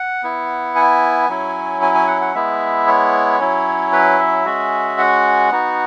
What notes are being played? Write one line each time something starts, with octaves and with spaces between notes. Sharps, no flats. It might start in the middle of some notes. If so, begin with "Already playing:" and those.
Already playing: F#5
B3 E4
G#5
F#3 C#4 E4
G#5
G#5
F#5
F#5
G#3 B3 E4 E5
C#5
F#3 C#4 E4
B4
E5
G#3 C#4 F#4
F#5
B3 D#4 F#4